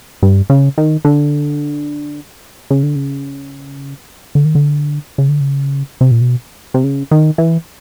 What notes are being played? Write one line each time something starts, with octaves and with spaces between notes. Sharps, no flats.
G2
C#3
D#3
D3
C#3
D3
C#3
D3
D#3
D3
C#3
D3
C#3
C3
A#2
B2
C3
C#3
D#3
E3